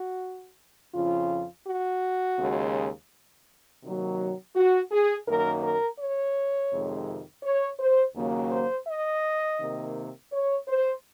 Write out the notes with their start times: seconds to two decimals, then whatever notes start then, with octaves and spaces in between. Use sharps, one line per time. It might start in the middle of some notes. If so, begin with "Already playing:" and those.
Already playing: F#4
0.94 F2 C#3 F3 F4
1.66 F#4
2.38 D#2 C#3 G#3
3.82 C3 D#3 F#3 A#3
4.54 F#4
4.91 G#4
5.26 F#2 D#3 F#3 A#3 A#4
5.62 A#4
5.99 C#5
6.71 F2 C3 D#3 G#3
7.43 C#5
7.79 C5
8.15 D#2 C#3 F#3 A#3
8.51 C5
8.87 D#5
9.59 C3 D#3 A#3
10.31 C#5
10.67 C5